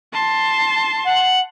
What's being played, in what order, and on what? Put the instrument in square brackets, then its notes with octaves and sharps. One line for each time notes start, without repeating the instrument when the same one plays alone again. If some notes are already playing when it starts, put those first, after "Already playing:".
[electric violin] A5 C6
[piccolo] F#5